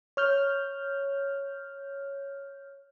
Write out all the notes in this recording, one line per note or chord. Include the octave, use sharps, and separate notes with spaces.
C#5 F6 G6